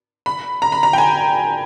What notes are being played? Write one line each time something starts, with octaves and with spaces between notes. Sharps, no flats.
B5
A#5
B5
A#5
G5
G#5